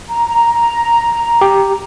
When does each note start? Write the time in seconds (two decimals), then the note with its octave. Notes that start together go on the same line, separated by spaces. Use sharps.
0.09 A#5
1.41 G4